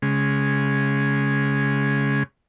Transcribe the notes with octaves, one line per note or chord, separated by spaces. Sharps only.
C#3 G#3